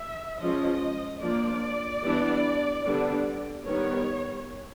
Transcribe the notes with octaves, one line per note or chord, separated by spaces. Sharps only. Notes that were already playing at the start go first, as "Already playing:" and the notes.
Already playing: E5
F3 G#3 C#4 D#5
F3 A#3 D4 D5
E3 G3 B3 D4
D3 G3 B3 D4
D#3 G3 B3 C#5